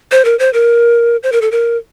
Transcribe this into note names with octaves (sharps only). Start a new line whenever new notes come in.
C5
A#4
C5
A#4
C5
A#4
A4
A#4